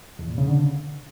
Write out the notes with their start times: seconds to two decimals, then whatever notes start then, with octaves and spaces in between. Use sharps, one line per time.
0.19 E2
0.28 A#2
0.38 C#3
0.47 D3